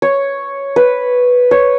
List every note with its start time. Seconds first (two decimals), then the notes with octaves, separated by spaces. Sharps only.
0.02 C#5
0.76 B4
1.51 C#5